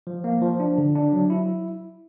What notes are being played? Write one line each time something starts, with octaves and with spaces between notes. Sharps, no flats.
F3
A#3
F3
D4
D3
D4
F#3
E4